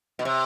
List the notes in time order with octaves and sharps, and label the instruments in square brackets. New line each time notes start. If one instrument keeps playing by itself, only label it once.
[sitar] B2
C3